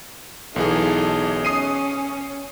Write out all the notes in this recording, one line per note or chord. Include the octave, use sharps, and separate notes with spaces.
B1 E3 D#4 G#4 A4
C#4 D#6 C7 D#7